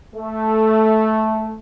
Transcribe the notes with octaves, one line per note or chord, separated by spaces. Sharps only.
A3